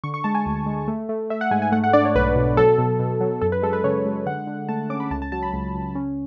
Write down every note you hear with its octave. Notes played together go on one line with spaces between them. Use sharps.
D3 C#6
C#6
G#3 A5
G#5
D2
G#3
A3
A3
A3 E5
F#5
G#2 G#5
G#5
A3 F#5
F#5
D4 D5
C#5
B1 B4
B2
F#3 A4
B2
B2
F#3
F#2 A4
B4
G#3 A4
B4
C#3 C#5
G#3
D3 F#5
D3
A3 A5
C#4 D6
B5
C#2 A5
A5
F#3 A5
B5
C#2
C#2
C#4